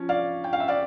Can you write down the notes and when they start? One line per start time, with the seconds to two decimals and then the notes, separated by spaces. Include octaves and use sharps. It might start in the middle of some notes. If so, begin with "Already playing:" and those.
Already playing: F3 C#4
0.09 D5 F5
0.44 G5
0.53 F5
0.60 E5
0.68 D5 F5